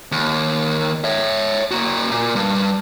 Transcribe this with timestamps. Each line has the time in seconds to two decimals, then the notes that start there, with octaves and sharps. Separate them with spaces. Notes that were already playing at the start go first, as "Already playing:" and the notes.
0.12 D#2
1.04 C#5 E5
1.71 A#3 F#4
2.11 A#2
2.36 G2